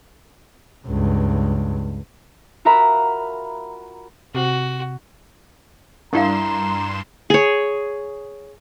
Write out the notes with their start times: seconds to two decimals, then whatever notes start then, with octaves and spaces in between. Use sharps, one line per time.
0.87 C#2 G2
2.65 F4 F#4 A#4 E5 A#5 B5
4.35 C3 F#4
6.13 G2 D4 E4 A#4 F5 A#5 C6 E7
7.30 G#4 C#5